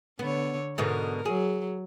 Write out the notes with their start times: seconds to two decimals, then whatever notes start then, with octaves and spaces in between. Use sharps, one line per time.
0.19 D3 B3 C#5
0.78 G#2 B2 D3 A#4
1.25 F#3 G#4